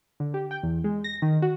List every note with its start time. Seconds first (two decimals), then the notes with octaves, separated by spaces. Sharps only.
0.20 D3
0.34 G4
0.51 G5
0.63 E2
0.84 G#3
1.04 A#6
1.22 D#3
1.42 F#4